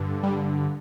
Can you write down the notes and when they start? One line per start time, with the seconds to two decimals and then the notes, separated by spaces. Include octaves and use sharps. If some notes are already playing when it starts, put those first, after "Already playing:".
Already playing: G2 D3
0.23 G3